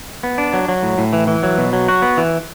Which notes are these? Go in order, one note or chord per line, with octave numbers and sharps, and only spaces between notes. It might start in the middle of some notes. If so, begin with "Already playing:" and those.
B3
D4
F#3
F#3
A2
A2
E3
E3
F#3
B2
F#3
F#4
B3
E3